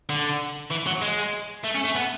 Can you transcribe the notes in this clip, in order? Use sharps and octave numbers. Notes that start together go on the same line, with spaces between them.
D3
E3
F#3
G#3
A3
C#4
A3
B3